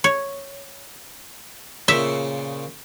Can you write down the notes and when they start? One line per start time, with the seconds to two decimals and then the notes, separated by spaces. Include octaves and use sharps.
0.04 C#5
1.88 A#2 C#3 C5 E5